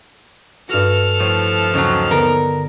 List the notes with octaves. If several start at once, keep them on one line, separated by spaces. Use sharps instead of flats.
G2 F#4 A4 F6
A2 F3
D#2 C#3 F#3
D3 B3 A#4